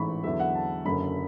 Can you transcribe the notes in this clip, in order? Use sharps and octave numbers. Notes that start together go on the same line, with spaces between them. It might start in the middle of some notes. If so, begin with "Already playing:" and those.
Already playing: A1 G#2 E3 B5 C#6
E2 D3 F#3 E5
F#5
A5
F#1 F#2 D3 B5